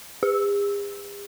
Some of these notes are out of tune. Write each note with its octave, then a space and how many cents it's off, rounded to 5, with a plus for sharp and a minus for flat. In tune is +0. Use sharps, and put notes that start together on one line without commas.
G#4 -45